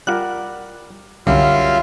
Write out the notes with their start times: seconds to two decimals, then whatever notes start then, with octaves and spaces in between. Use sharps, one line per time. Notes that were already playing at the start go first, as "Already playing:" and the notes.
0.07 G3 F4 A#4 F#5 F#6
1.27 C2 F#2 D3 G3 F4 E5 F5